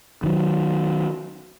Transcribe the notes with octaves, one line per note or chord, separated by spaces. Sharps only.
D#3 F#3